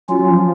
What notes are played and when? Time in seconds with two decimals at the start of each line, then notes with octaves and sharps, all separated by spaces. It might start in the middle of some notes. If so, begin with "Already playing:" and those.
0.09 F#3 C#4 F4
0.19 F#3
0.31 F3